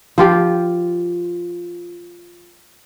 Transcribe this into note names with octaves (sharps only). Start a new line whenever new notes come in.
F3 F4 G4